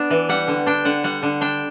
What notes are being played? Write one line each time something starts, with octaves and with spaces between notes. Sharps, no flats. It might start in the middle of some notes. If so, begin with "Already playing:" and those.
Already playing: B3 D4
E3
G3 F#5
D3
D4 G5
D3 F#5
G3 F#5
D3
D4 G5